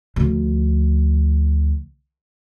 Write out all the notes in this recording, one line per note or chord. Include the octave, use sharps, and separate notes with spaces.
D2 F3